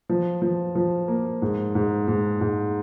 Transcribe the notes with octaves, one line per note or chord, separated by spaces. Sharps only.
F3
F3
F3
A#3
G#2
G#2
G#2
G#2